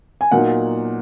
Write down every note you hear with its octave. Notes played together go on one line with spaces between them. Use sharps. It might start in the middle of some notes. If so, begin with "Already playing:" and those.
G#5
A#2 F#3 B3 D#4 F#5